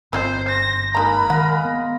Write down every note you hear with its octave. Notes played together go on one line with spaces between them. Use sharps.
G1 C4 F4 C5 D#5
C5 A#6
D#3 G#3 A#3 A#4 B4 A#5 B5
D#3 B4 F5 F#5 A#5
B3